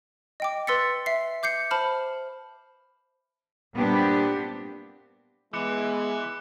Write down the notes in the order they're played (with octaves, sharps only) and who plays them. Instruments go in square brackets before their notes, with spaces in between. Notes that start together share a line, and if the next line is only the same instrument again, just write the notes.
[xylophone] D#5 G5 D6
B4 C6 E6 A6 B6 C#7
E5 C7
D6 G6 C7 C#7
C5 A5 B5 F6
[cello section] A#2 G3 B3 C4 D4 G4
[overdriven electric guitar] E3 [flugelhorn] G#3 [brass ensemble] B3 E4 [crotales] D6 F#6 C#7